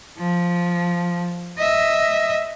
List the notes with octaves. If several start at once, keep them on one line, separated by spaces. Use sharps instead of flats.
F3
D#5 E5